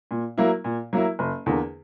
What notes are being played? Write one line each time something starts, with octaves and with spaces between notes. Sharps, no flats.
A#2
F#3 A#3 E4
A#2
F#3 A#3 E4
F#1
E2 D3 A#3